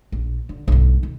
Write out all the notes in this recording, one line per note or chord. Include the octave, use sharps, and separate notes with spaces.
A#1
D3
B1 G2
D#3